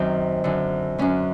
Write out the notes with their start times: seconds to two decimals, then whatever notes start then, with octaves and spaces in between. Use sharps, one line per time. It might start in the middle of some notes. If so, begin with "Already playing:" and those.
Already playing: F#2 D#3 C4
0.44 F#2 D3
0.98 F#2 D3 C#4